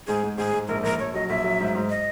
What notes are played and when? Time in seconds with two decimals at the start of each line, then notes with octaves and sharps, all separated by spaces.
0.07 G#2 G#4
0.23 G#2
0.37 G#2 G#4
0.53 G#2
0.68 A#1 A#4
0.83 A#1 A#4
0.99 A#1 C#5
1.14 F#3 D#5
1.29 A#1 E5
1.44 F#3
1.60 G#2
1.75 G#2
1.90 D#5